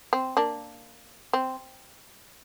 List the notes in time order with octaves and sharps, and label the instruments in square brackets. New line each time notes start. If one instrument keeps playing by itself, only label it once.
[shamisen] C4
A#3 D4
C4